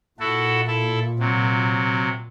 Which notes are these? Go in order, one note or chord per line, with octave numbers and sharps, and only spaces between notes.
A#2 E4 F#4 A4
E4 A4
C3 F#3